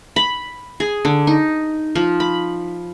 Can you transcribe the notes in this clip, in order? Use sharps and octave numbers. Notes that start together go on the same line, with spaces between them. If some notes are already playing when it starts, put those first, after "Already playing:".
B5
G#4
D3
D#4
F3
B5